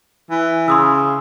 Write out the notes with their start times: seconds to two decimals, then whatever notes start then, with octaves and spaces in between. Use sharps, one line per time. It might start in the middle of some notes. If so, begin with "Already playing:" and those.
0.31 E3
0.68 C#3 C6 D#6 E6